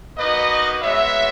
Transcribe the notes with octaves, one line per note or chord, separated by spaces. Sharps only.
A#3 D#4 F#4 B4 D#5
G#3 B3 F#4 C#5 E5